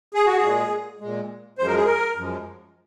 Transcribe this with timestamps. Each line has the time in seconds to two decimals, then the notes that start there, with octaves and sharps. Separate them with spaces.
0.14 G#4
0.26 F#4
0.37 G#4
0.43 A#2 G#3
1.01 A#2 G#3
1.58 F#2 F3 G#3 C5
1.67 A#4
1.76 G#4
1.85 A#4
2.17 F#2 F3 G#3